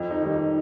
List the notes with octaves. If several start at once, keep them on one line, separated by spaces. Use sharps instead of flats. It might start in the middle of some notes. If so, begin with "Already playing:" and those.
Already playing: F2
D#4
D#3 G3
D#4